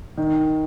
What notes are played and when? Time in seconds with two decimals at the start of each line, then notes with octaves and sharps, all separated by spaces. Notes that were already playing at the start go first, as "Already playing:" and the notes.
0.17 D#3